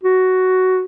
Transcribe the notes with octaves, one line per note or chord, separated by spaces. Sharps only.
F#4